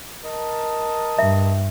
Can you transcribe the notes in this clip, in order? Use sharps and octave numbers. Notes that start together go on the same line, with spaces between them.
A#4 D#5 A5
G2 E5